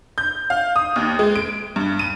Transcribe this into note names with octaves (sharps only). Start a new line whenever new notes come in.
G6
F5
D#6
D#2
G#3
D7
G2
D#7